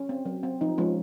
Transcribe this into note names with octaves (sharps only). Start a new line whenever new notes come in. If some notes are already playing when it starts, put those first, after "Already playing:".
Already playing: C#4
C4
F#3
C4
F3 D#4
F3 G#3 C#4 F4